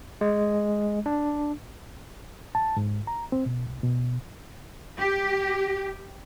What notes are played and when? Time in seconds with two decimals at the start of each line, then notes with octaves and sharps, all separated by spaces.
0.21 G#3
1.06 D4
2.55 A5
2.77 G#2
3.07 A#5
3.32 C4
3.46 B2
3.66 C2
3.83 B2
4.99 G4